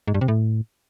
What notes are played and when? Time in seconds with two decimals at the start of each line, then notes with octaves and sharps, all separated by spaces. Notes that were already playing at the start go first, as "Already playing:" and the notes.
0.08 G#2
0.14 G2
0.21 C3
0.28 A2